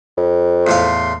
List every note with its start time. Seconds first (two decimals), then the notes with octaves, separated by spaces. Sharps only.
0.17 F2
0.67 E2 A2 F5 C6